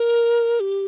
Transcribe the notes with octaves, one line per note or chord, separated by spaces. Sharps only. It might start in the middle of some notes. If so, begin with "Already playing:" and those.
Already playing: A#4
G4